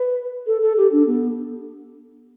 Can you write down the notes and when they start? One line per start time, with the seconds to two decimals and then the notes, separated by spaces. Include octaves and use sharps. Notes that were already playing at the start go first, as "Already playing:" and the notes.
Already playing: B4
0.47 A4
0.62 A4
0.77 G4
0.92 D4
1.07 B3